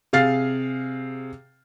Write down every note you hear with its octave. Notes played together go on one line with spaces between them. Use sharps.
C3 G#4 F5 F6 A6 C7